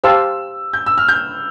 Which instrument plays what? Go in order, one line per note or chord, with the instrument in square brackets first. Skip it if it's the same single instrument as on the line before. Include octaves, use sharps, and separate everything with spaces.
[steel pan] G4 C5 F5 A5 C6 [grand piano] E6
[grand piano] G6
E6
F6
G6